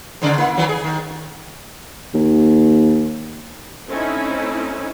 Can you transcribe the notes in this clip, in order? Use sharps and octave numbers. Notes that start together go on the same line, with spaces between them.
G#2 C#3 D5
A#3 E4
D#3 E3 F#3
G#4
D#3
D#2
A3 C4 C#4 D#4 E4